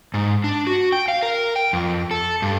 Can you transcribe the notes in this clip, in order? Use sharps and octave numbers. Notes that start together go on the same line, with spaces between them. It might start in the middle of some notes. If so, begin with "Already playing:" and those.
G#2
D4
F#4
G5
F5
A#4
G5
F2
A4
G2